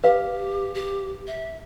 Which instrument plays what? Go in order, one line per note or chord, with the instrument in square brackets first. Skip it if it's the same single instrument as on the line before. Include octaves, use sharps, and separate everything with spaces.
[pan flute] G4 [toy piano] B4 F5
[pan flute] G4
E5